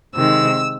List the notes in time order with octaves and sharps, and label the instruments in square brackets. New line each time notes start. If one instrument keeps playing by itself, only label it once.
[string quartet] C3 D#3 G#3 E6